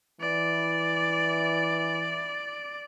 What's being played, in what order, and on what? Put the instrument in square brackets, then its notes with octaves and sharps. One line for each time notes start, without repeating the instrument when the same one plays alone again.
[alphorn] E3 [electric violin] D5